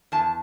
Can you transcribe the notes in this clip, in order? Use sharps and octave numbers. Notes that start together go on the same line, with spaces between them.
E2 A5